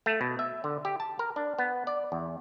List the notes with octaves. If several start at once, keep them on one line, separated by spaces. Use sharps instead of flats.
A3
B2
E5
D3
G4
A5
A#4
D4
B3
D5
E2